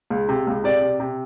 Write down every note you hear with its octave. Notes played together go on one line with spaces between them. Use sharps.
C#2
C3
C#2
C3 D5
C3
C3